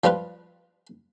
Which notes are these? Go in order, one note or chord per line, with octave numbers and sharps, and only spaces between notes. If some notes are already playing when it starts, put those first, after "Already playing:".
F3 G3 F4 B4